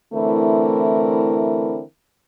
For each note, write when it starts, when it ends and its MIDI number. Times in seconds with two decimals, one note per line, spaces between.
0.13 1.81 50
0.13 1.81 52
0.13 1.81 57
0.13 1.81 60
0.13 1.81 64
0.13 1.81 70